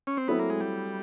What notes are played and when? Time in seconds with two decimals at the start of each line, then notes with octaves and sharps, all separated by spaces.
0.07 C#4
0.17 C4
0.28 F#3 A3 B3 C4 E4
0.39 A#3
0.50 G#3
0.60 G3